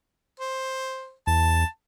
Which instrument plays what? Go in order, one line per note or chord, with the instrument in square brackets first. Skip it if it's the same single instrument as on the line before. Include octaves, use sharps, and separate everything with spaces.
[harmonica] C5
[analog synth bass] E2 [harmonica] A5